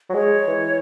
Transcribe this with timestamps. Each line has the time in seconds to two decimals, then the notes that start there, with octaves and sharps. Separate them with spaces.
0.10 F#3
0.14 G#3 C#5
0.47 E3